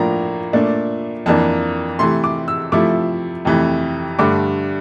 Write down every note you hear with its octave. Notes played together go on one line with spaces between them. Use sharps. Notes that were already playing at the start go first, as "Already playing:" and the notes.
Already playing: A2 F3 A#3 D4 A#5
A#2 A3 D4
F2 E3 A#3 D4 A5
C3 E3 A3 C6
D6
E6
C3 F3 A3 E4 D6
F2 C3 E3 A3
G2 D3 A3 D6